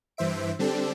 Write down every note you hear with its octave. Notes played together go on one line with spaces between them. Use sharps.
G2 E3 C5 E5 D7
D3 G3 C4 D4 G4 A4